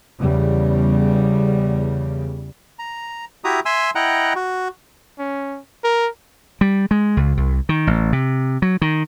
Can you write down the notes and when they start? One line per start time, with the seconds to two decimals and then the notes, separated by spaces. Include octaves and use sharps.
0.20 E2 C#3 G3
2.79 A#5
3.44 E4 F#4 G4 E5 A#5 D#6
3.66 E5 G#5 C6 E6
3.95 E4 D#5 F#5 G5 A#5 F#6
4.36 F#4
5.19 C#4
5.84 A#4
6.61 G3
6.91 G#3
7.17 C#2
7.37 C2
7.69 D#3
7.87 A1
8.13 C3
8.62 F#3
8.82 D#3